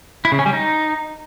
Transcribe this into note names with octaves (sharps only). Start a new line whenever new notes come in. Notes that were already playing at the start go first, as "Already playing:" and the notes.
E4
C#3
C#4
G3
D#4